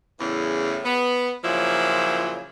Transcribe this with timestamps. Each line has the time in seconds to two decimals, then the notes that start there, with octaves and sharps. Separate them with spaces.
0.20 E2 A2 C#3 E3
0.84 B3
1.44 A#2 C#3 F3 F#3 E4